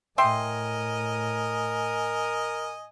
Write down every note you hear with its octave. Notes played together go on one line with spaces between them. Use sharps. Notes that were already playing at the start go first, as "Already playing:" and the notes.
A2 A#4 D#5 E5 G5 G#5 C6